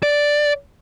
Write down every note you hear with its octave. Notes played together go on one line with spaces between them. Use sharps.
D5